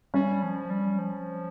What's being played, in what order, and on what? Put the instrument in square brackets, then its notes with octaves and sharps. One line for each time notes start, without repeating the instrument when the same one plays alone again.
[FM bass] G3 [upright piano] C#4
[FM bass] F3
G3
F3